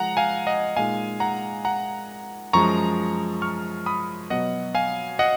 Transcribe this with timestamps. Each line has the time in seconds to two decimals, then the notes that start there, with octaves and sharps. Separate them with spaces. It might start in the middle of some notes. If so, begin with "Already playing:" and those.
Already playing: F3 G#3 F#5 A#5
0.17 F5 G#5
0.47 D#5 F#5
0.76 A#2 G#3 D#4 F5 G#5
1.20 F#5 A#5
1.65 F#5 A#5
2.53 F#2 F3 G#3 A#5 C#6
3.42 C#6 F6
3.86 B5 D#6
4.30 B2 F#3 B3 D#5 F#5
4.75 F5 G#5
5.19 D#5 F#5